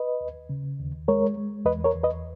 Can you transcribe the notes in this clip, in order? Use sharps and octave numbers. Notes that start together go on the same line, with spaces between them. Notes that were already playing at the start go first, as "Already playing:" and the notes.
Already playing: B4 D#5
D#2
C#3
D#2
G#3 A#4 C#5
G#3
E2 B4 D#5
A#4 C#5
E2
B4 D#5